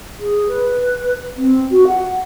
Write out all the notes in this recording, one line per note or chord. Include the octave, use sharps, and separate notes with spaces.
G#4
B4
C4
F#4
F#5